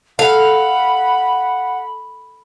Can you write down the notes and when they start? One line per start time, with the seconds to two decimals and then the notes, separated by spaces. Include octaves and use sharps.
0.19 A4 F5 F#5 B5